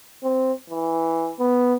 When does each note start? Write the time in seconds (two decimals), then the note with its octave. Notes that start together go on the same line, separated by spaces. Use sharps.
0.23 C4
0.70 E3
1.39 B3